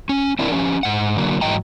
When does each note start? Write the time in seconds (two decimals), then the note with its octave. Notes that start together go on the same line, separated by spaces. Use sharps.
0.09 C#4
0.39 C4 D4 E4 A#4
0.52 F3 C#4 G4
0.83 G#2 F#5
1.16 D3 F#3 A#3
1.41 G#2 E3 F#3 D#5 G5 A#5